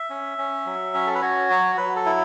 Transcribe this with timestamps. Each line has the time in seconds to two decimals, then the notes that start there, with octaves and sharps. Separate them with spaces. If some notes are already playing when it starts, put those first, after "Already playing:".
Already playing: E5
0.10 C#4
0.38 C#4
0.66 F#3
0.94 C#4
1.07 A4
1.14 B4
1.22 F#4 C#5
1.50 F#3
1.77 F#3 B4
1.96 A4
2.05 E4